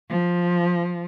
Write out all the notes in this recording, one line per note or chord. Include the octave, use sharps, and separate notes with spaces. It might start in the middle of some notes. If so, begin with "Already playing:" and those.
F3